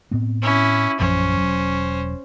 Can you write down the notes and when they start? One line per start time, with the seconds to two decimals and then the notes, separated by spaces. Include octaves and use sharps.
0.11 A2 B3 C4
0.42 C#4 E4
1.00 A#1 F#2 F3 C#4 C5
1.37 E1 F#3